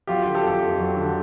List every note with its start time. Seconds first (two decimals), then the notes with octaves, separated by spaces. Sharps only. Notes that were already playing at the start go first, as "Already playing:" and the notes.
0.07 F#3 F4 G4
0.25 D3
0.35 G4 A4
0.44 F2
0.61 F2
0.80 F#3
0.97 D3